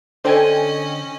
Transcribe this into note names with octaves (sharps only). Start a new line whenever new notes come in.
D3 C#4 C5 D#5 G5 G#5